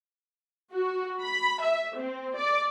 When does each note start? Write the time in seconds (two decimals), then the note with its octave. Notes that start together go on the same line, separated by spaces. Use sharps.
0.72 F#4
1.21 B5
1.61 E5
1.97 C4
2.36 D5